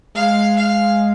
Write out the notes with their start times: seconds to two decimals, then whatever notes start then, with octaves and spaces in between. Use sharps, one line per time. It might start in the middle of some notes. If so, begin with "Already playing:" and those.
0.15 G#3 F5
0.57 F5